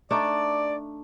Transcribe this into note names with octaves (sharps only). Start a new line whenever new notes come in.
A3 D4 D#4 D5